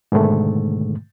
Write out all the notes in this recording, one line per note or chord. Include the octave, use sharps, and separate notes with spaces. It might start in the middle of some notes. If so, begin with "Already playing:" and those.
G#2 B2 D3 D#3 G#3 A3